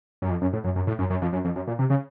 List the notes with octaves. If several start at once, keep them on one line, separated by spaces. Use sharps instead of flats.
F#2
F2
F#2
A2
F#2
F#2
A2
F#2
F#2
F2
F#2
F2
F#2
A#2
C3
C#3